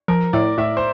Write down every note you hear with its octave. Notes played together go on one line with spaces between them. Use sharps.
F3 A#4
A2 D5
A2 E5
C5